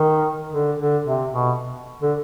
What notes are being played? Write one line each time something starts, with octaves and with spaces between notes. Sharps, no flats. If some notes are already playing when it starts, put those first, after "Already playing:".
Already playing: D#3
D3
D3
C3
B2
D3